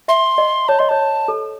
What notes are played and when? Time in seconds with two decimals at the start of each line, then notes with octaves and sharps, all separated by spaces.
0.08 E5 C6
0.38 D#5
0.68 C#5 A5
0.79 D#5 C6
0.89 C#5 A5
1.28 A4